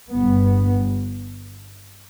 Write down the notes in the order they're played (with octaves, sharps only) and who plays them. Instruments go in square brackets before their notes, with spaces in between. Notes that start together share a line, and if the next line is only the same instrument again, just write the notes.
[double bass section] G1 G2 B3